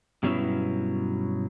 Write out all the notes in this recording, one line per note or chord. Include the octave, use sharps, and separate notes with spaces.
G2 B2 F#3 B3 C#4 E4